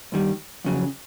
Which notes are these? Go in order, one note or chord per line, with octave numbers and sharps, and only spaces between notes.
G2 D#3 G3
F2 C#3 F#3